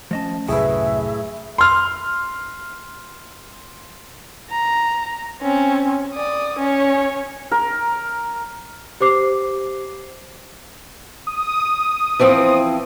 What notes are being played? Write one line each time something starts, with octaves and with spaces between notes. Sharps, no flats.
F3 A3 C#4 D#5 A5
C2 F#2 A2 F#3 G#4 B4 E5
C6 F6
A#5
C4 C#4
D5 D#6
C#4 C#5
A#4
G4 C5 D6 C7
D#6
E3 F3 C4